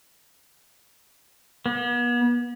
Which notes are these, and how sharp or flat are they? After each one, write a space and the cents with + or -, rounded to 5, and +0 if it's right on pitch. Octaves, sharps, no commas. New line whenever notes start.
B3 -40